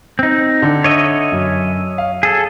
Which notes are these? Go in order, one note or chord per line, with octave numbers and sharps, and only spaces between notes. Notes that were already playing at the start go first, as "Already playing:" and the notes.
C4 D#4
D3
C#5 D#5 E5
F#2
F5
G#4 A4